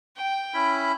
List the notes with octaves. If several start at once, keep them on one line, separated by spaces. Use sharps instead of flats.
G5
C#4 E4 B5